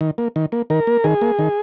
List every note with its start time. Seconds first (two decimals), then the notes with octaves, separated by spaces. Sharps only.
0.01 D#3
0.18 A#3
0.36 D#3
0.52 A#3
0.70 D#3 A#4
0.87 A#3
1.04 D#3 G#4
1.21 A#3
1.39 D#3